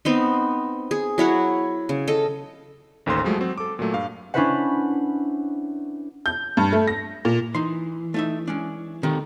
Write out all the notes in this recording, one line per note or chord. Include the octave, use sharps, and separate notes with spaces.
B3 C4 D#4
G#4
F#3 E4 C#5 F#5
C#3
A4 D#5
A1 D#2 A4 C5 C6
F3 F#3 G#3 A3
F#3 C4
A4 D6
A#2 F#3 A3
G2 F5
C#4 D4 E4 B4 C5 F#5
G6
G2
A3
A#6
A#2
E3 D#4 C6
A3 D#4 E5
G#3 C#4 D4
D#3 C4 G4 A4